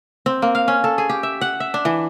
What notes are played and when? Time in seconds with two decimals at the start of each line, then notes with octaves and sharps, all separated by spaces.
0.26 C4
0.42 A#3
0.55 F5
0.68 C#4
0.84 A4
0.98 G#4
1.09 G4
1.23 E5
1.41 F#5
1.60 E5
1.74 D4
1.85 E3